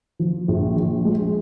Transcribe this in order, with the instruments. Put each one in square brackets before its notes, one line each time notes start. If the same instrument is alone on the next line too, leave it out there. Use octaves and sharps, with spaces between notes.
[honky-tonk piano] F3
A#1
F3
G#3